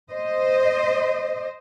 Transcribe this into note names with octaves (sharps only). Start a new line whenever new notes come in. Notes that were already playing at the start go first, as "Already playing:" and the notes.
C5 D#5